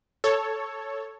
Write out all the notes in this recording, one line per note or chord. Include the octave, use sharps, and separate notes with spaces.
A4 C#5